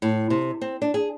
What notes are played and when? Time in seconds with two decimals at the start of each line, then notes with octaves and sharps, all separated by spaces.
0.02 A2
0.30 C3
0.61 C4
0.82 D4
0.94 G#4